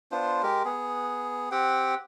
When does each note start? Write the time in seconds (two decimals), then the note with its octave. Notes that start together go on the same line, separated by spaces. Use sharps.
0.12 B3 D4 F4 C5
0.43 G#3 G4 A#4
0.65 B3 G#4
1.52 C4 G4 F#5 G5